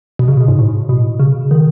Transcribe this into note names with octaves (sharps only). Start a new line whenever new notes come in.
B2
C#3
B2
G#2
A2
B2
C#3
D#3